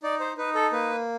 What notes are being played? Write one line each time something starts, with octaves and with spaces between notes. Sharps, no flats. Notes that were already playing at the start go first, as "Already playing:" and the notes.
D#4 D5
C5
D#4 B4
A4
A#3 B4